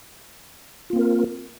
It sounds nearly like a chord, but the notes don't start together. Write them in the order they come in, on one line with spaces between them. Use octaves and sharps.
F4 A#3 C4 A#4